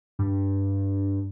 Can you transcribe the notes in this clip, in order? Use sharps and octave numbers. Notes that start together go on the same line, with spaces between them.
G2